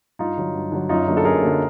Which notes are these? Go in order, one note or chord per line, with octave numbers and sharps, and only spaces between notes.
G2 D#4 F4
D3 F#3
G2
D3 F#3
F#2 D#4 F4
D3 F#3 A#3
A4
F#2 G#4 A#4
D3 F#3 A#3